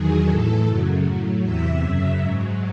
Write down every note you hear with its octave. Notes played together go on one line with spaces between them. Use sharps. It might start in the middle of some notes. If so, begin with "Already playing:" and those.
Already playing: E2 D#3 F#3 G#4
A2 E3 A4
F#2 C#3 F#3
A2 F#3
E2 C3 E3 E5
F#2 C#3 F#3 E5
G#2 F#3